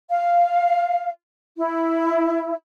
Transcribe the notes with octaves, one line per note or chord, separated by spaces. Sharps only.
F5
E4